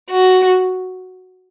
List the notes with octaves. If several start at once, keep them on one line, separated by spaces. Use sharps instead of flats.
F#4